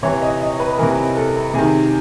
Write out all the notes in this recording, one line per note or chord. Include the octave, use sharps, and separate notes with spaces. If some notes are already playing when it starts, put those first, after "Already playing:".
C3 E3 C#5
D#5
D#5
B4
C3 E3 A#4
A4
C3 D#3 G#4